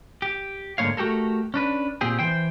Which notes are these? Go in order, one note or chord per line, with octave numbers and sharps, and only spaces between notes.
G4
G#2 D3 A#3 C4 C#5 F5
A3 F#4 G4 A4 A#4
C#4 D4 B4
A#2 C4 G4 G#4
E3 C5 G5